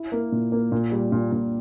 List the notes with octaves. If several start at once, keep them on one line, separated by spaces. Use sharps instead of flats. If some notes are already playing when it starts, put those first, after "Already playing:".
Already playing: E4
A#3
A#2
A#3
A#2
G3
A#2
A#2